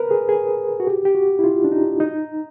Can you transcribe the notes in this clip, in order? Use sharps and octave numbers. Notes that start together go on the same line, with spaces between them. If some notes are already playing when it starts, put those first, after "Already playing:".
Already playing: A#4 B4
G#4
G#4
F#4
G4
G4
F#4
E4
F4
D4
D#4
D#4